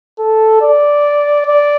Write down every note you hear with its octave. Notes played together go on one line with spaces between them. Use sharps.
A4
D5
D5